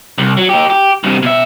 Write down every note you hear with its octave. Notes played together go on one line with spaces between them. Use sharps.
C2
F#3
D#4 G4
G4
G2 C3
B2 E5